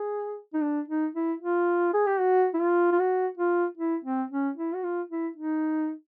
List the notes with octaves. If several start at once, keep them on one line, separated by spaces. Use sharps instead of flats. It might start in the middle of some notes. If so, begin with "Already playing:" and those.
Already playing: G#4
D#4
D4
D#4
E4
F4
G#4
G4
F#4
E4
F4
F4
F#4
F4
E4
C4
C#4
E4
F#4
F4
E4
D#4